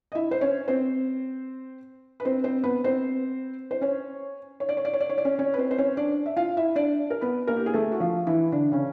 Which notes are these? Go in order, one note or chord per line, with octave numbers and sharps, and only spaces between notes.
D#5
E4 E5
C5
C#4 C#5
C4 C5
B4
C4 C5
C4 C5
B3 B4
C4 C5
C5
C#4 C#5
C#5
D5
C#5
D5
C#5
D5
C#5
D5
C#4 C#5
C#4 C#5
B4
C4 C5
C5
C#4 C#5
D4 D5
E5
F4 F5
E4 E5
D4 D5
A#4
B3 B4
A#3 A#4
G4
G#4
A3 A4
F#4
F3 F4
E3 E4
D3 D4
C#3 C#4